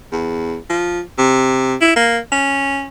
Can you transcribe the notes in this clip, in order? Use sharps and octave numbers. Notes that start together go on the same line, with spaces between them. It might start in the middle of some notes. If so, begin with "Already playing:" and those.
E2
F3
C3
E4
A#3
C#4